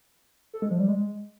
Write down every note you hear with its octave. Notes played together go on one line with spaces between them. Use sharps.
A4
G#3
F3
G3
G#3